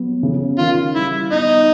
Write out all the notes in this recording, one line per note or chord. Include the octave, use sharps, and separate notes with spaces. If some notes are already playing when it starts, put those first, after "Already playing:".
Already playing: F#3 B3
C#3
D#3 F4
G3 E4
B3 D#4